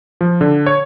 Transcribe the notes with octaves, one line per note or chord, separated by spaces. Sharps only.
F3
D3
C#5